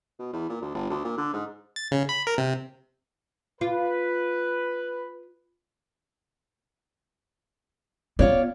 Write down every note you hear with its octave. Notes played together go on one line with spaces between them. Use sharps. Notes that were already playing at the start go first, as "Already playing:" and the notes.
B2
E2
A#2
D2
G1
D2
A#2
D3
G#2
A6
C#3
B5
A#4
C3
F4 B4
B3 F4 C#5 D5